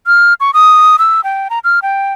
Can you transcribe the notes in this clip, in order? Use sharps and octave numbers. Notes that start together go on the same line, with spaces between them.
F6
C#6
D#6
E6
G5
A#5
F6
G5